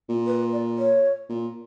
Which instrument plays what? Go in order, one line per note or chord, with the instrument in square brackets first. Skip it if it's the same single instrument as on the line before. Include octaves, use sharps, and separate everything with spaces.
[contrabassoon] A#2
[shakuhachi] B4
D5
C#5
[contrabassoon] A#2